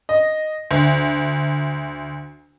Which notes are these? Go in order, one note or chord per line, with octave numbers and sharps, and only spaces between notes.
D#5
D2